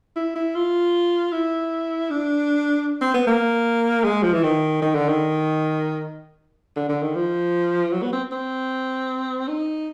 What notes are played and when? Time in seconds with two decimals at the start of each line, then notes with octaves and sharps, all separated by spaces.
0.16 E4
0.35 E4
0.55 F4
1.32 E4
2.10 D4
3.01 C4
3.14 B3
3.27 A#3
4.04 G#3
4.22 F3
4.33 E3
4.43 D#3
4.82 D#3
4.95 D3
5.08 D#3
6.76 D3
6.89 D3
7.02 D#3
7.15 F3
7.93 F#3
8.03 B3
8.12 C4
8.32 C4
9.48 D#4